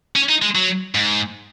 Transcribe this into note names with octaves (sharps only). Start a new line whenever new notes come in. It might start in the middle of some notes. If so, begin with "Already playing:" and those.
C#4
D#4
G#3
F#3
G#2